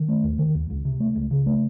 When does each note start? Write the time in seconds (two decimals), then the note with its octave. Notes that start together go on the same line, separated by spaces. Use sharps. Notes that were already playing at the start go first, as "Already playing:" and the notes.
Already playing: D#3
0.08 A3
0.24 D#2
0.38 D#3
0.55 D#2
0.70 C#2
0.85 C3
1.00 A3
1.16 C#2
1.31 C#3
1.46 A3